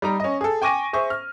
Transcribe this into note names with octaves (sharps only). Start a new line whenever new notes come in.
G3 D#4 A#5
C#4 D#5
G#4 A4
G5 G#5 C#6 D6 A#6 D#7
G#4 C5 E5 C#6
F6